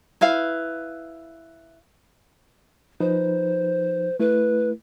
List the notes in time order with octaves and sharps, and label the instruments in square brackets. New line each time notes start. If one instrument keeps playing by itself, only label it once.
[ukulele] E4 B4 F5
[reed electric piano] F3 D#4 B4 [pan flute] C5
[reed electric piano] A3 E4 [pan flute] B4